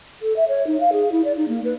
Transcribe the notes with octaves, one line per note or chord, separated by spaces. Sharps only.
A4
E5
C#5
D#4
F5
G#4
E4
D5
D#4
A#3
B4